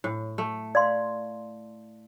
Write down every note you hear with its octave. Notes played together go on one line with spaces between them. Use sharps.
A2
A3
D5 F5 C6